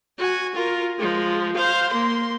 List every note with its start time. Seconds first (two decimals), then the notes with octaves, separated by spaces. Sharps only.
0.18 F#4 G#5
0.54 F4 A#4
0.98 F3 G#3
1.56 C5 F5
1.89 A#3 C6